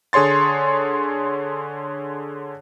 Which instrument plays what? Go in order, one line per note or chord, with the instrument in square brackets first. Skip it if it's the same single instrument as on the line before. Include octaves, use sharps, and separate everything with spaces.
[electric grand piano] D3 G#4 C#5 C6 A6